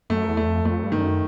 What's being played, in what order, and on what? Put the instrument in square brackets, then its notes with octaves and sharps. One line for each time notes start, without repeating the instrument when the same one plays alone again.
[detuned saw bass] F#2 [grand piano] A3
[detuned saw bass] E2
[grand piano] A3
[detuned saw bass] F2
[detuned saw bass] F2 [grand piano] A3
[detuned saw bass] G2
[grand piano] D#3
[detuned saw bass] F#2